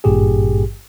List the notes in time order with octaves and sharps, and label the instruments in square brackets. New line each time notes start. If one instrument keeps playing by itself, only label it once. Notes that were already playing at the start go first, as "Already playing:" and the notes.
[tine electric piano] G#1 G2 A#2 G4 G#4